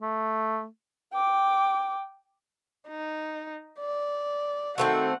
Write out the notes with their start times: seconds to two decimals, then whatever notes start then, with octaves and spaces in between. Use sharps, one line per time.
0.01 A3
1.13 G5 D6
2.88 D#4
3.79 D5
4.78 D#3 A3 B3 C4 F#4 A4 F#5